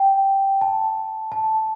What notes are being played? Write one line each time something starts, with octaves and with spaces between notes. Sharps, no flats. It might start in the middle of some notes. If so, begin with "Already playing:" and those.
Already playing: G5
A5
A5